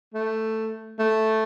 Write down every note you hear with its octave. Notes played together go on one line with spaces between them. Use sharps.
A3
A3